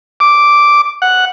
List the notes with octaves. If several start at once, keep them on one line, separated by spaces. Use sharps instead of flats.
D6
F#5